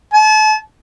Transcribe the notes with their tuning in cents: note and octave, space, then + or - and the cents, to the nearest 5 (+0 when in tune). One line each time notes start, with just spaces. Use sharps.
A5 -40